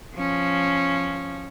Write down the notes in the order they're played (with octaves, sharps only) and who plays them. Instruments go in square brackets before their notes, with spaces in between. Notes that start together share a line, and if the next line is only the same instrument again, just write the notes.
[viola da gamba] F3 C#4